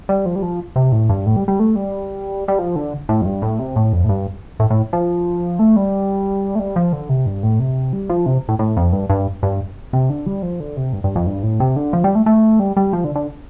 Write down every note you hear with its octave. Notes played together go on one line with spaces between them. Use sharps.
G3
F3
G3
F3
C3
A2
G2
A2
G3
G3
A3
G3
G3
F3
D3
A2
F2
G2
A2
C3
A2
F2
A2
G2
A2
A2
F3
A3
G3
A3
G3
F3
D3
C3
G2
A2
C3
G3
F3
C3
A2
A2
F2
G2
G2
G2
C3
D3
G3
F3
D3
C3
G2
G2
F2
G2
A2
C3
D3
F3
G3
A3
A3
G3
G3
F3
D3
D3